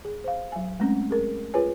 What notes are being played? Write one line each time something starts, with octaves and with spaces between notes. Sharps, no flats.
G#4
C5 F5
F#3 G#5
G#3 A3 C4 C#4
G#4 A#4
F4 G#4 B4 C#5 G#5